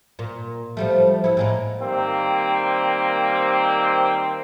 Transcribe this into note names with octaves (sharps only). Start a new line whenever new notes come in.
A#2
F3 G3 A3
B3 E4
A2 G#3 A#3
D#3 G3 A#3 C4